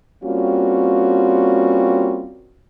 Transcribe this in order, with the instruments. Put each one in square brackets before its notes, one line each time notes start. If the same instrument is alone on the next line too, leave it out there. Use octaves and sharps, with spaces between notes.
[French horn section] G3 A#3 C4 C#4 F4 F#4